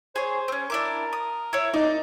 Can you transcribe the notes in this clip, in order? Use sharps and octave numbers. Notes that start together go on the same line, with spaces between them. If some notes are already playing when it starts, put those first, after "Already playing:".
G#4 C5 C#5
C4 C#4
D4 E4 A#4 D6
D#6
E4 C#5
D#4 D5